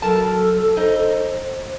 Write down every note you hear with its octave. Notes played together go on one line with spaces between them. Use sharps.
F#3 A4 A#4 A5
D#4 C5 D#5